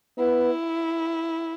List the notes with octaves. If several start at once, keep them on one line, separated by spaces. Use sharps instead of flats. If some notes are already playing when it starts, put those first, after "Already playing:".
B3 E4